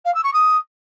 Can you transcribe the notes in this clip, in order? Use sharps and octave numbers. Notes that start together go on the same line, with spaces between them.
F5
E6
C#6
D#6